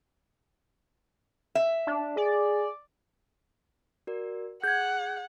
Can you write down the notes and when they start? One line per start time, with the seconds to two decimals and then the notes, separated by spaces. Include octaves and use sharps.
1.55 E5
1.87 D4
2.17 G#4 D5
4.07 F#4 A#4 D5
4.64 G#4 F#5 G6 G#6